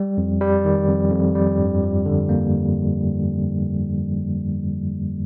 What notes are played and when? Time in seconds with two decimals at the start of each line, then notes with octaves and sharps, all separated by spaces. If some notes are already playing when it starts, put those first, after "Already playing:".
Already playing: G3
0.18 F2
0.41 G3
0.65 D#3
0.88 F2
1.11 F2
1.35 G3
1.59 G2
1.82 F3
2.06 D3
2.29 A#3